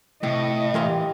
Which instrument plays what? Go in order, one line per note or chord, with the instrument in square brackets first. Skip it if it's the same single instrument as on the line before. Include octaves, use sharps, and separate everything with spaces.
[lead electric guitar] A2 [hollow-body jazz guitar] C3 [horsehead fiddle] D#5
[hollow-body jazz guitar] E3 A#4 C6 [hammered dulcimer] G4 F5